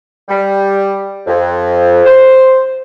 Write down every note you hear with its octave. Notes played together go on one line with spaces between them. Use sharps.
G3
F2
C5